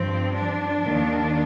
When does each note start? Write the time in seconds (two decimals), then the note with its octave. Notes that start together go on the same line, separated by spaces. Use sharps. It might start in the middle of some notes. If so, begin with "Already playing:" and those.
Already playing: G2 F3 C4
0.34 D4
0.82 D#2 D#3